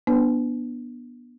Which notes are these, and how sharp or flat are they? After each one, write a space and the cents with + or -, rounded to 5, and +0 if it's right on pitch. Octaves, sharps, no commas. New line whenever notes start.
B3 -25 D4 +10 B4 +35